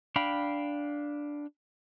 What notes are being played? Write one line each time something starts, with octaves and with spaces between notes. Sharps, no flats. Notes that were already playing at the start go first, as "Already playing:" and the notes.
D4 F5 G5 B5